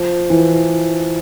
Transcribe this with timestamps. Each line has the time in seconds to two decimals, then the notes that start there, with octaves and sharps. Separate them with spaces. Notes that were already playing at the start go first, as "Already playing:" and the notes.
Already playing: F3
0.30 E3